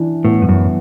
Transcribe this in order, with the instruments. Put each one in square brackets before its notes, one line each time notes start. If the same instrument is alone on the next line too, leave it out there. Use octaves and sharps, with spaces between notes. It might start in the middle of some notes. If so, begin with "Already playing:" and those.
Already playing: [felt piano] E3 D4
[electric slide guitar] A2 [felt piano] B3
[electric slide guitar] G2
F#2